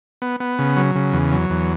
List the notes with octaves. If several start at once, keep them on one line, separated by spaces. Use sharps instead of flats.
B3
B3
C#3
F#3
C#3
E2
F#3
E2